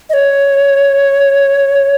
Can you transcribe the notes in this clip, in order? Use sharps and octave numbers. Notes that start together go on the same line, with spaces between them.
D#5
C#5